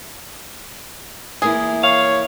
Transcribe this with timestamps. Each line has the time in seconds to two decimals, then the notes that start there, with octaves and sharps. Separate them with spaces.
1.42 E2 A#3 E4 G#4
1.83 C#5 F5